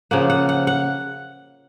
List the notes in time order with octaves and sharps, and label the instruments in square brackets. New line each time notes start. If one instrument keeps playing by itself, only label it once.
[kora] C#3 F3 A#3 F#5
F#5
F#5
F#5